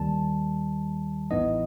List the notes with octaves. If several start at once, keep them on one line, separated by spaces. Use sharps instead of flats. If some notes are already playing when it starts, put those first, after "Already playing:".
Already playing: D#2 D#3 G3 A5
A1 A2 E3 B3 D#4 D#5